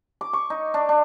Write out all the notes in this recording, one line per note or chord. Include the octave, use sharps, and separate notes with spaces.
D6
C#6
D#4
D4
D4